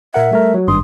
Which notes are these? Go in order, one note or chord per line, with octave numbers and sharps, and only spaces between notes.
A#2 A#4 E5 F#5
G3 A3 A#4
F#3 F#4
G#1 G2 C6 D#6